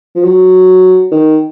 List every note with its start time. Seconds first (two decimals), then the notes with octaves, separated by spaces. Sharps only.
0.16 F3
0.24 F#3
1.11 D#3